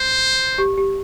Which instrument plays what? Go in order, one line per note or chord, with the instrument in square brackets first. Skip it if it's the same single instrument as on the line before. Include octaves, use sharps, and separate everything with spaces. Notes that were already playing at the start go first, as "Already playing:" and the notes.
Already playing: [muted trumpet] C5
[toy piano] G4
G4